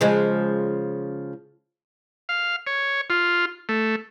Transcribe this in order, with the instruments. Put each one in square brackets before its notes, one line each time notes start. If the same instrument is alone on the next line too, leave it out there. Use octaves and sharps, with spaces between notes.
[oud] C#3 F3 G#3
[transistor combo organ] F5
C#5
F4
A3